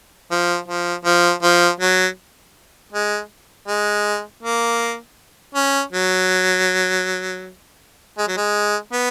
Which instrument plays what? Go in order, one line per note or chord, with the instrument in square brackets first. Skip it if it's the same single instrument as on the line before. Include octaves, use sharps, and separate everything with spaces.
[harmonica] F3
F3
F3
F3
F#3
G#3
G#3
A#3
C#4
F#3
G#3
F#3
G#3
B3